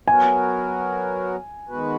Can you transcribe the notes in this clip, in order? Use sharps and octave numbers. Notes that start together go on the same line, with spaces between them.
F#3 B3 F#4 A#4 G#5
D#3 G#3 B3 F#4 B4